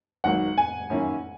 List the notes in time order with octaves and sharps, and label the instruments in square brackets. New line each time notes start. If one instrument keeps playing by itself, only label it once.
[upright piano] G#1 G#2 F#3 A#3 [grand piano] F#5
[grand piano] G#5
[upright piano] F#2 D#3 A#3 C#4 E4